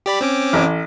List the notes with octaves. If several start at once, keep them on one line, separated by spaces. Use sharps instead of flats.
G4 D5 B5
C4 C#4 D6
A1